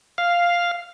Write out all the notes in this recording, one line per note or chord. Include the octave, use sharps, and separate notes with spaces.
F5